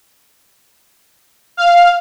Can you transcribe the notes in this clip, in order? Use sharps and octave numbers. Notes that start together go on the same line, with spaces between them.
F5